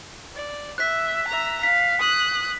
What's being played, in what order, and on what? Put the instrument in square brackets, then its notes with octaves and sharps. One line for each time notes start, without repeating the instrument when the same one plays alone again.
[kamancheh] D5
[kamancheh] E5 [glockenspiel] F#6 B6
[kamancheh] E5 A#5
[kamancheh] F5 [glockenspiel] B6
[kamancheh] D#6 F#6